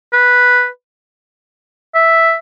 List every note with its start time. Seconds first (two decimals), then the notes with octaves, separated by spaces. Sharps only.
0.13 B4
1.95 E5